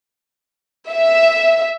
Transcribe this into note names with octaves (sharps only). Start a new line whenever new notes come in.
E5